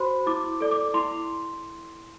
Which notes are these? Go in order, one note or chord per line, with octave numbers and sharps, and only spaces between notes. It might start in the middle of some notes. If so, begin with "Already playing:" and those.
Already playing: F#4 C5 B5 C6
E4 D6
A4 D5
D6
E4 C6